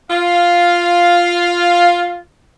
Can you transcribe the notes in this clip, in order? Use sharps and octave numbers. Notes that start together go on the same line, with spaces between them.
F4 F5